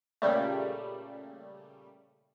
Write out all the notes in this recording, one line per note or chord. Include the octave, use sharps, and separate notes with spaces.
A#2 C#3 G3 A3